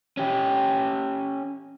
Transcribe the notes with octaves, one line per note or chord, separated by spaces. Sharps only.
C#4 G4